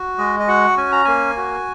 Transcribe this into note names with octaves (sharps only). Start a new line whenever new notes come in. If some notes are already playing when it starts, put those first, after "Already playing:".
Already playing: F#4
G#3 D#5
D#5
F#4 F#5
C#4 G#5
A#5
A#3 G#5
F#4